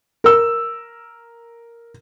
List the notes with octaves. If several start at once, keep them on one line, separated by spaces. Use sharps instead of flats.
A#4 E6